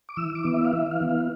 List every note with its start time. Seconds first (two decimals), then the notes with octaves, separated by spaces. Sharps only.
0.09 D6
0.17 E3 E6
0.35 D6
0.44 B3 E4
0.54 E5
0.65 F5
0.73 E3 E5
0.91 F5
1.00 B3 E4
1.10 F5